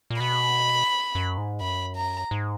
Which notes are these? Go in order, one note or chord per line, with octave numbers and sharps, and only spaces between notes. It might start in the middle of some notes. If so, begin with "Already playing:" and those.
A#2
B2 B5
F#2
G#2
F#2 B5
A#5
G#2